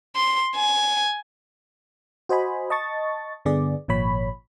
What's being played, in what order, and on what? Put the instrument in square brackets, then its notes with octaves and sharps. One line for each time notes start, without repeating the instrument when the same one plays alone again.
[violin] C6
G#5
[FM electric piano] F#4 C5 D#5 G#5 B5
D#5 A5 C#6 A6
G2 D3 B3 G#4 D5
G#1 A#2 F3 C#5 B5